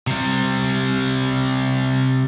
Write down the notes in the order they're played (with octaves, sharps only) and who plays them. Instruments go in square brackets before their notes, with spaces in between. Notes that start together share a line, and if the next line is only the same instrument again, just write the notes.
[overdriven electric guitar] C3 G3